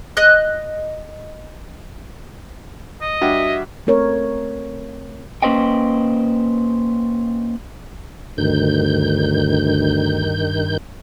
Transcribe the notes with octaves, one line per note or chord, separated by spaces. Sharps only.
D#5 F#6
D#5
G2 F#4 E5
A3 C4 A#4 C#5
A#3 C#4 B4 C5 D#5 G5
D2 G2 D#3 G6